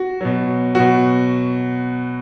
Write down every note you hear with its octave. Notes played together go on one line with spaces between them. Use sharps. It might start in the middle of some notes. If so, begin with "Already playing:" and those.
Already playing: F#4
B2 F#3
B2 F#3 F#4